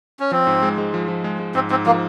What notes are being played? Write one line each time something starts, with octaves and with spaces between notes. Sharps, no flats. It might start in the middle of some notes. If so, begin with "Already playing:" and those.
C#4
F3 C4
G#2
G#3
G#3
F3
F3
G#3
G#3
G#2 C4
G#2 C4
F3 A#3